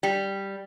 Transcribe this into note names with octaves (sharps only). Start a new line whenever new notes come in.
G3